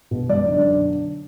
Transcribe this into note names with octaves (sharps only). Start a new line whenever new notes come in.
B2
F#2 D5
D3